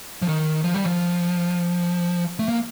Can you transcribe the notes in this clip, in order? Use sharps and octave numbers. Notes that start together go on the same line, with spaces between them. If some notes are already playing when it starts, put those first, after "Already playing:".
F3
D#3
F3
G3
F3
A3
A#3